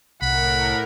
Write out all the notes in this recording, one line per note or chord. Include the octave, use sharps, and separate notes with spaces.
C2 A2 A#4 F#5 B5